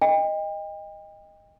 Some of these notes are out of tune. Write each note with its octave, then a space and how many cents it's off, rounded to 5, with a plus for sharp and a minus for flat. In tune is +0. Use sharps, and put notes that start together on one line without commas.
D#5 +0 G5 +35